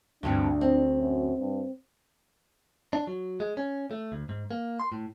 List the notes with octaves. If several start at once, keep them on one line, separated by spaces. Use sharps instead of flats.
D2 G2 C3 G3 D4
C4
F#2
G2
D4
F#3
G#3
C#4
A3
D2
G#2
A#3
C6
A2